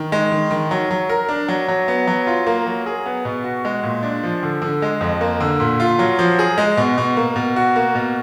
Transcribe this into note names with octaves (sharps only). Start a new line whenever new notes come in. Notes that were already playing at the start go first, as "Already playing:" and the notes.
Already playing: D#3
G#3
D#3
D#3
F#3
F#3
A#4
D4
F#3
F#3
B3
F#3
F4
A#3
F#3
G#4
B3
B2
F#4
G#3
A#2
D4
F3
D3
D3
G#3
F2
A#3
D3
A#2
F4
F#3
F3
G#4
G#3
B2
B2
A#3
B2
F#4
A#3
B2